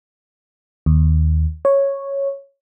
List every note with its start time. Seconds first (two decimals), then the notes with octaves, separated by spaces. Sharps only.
0.86 D#2
1.65 C#5